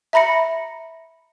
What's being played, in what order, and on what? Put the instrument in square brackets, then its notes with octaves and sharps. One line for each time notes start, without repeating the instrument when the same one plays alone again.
[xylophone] E5 A#5 B5 A#6 C#7